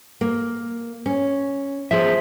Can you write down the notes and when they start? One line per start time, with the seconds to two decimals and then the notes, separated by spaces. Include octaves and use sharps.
0.21 A#3
1.06 C#4
1.91 F3 G#4 E5